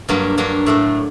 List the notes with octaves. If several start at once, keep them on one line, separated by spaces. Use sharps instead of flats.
G2 F#3 A#3 D4
G2 F#3 A#3 D4
A2 A3 D4